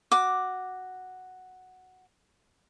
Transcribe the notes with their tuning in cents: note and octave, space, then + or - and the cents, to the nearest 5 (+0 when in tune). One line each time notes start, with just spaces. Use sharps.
F#4 +0 D6 +0